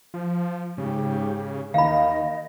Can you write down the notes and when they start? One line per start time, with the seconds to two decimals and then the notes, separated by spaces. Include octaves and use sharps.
0.14 F3
0.78 G#2 C#3 G4
1.74 D#2 D#3 D#5 F5 B5